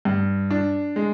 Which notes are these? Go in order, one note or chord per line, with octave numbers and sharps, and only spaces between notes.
G2
D4
G#3